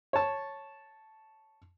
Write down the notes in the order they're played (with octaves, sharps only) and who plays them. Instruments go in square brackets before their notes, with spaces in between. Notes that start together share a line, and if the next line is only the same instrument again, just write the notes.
[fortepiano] C#5 A5